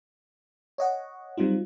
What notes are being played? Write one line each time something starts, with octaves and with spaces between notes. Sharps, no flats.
C#5 D#5 F#5
F#3 G3 C4 D#4 F4